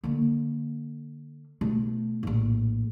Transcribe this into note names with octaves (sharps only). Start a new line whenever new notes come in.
D3 A#3
B2 A3
A#1 A2